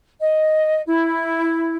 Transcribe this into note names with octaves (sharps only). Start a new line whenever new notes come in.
D#5
E4